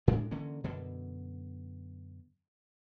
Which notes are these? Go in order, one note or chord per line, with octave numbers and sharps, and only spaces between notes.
A2 G#3 D4
D3 E3 A#3 C#4
F#2 B2 D3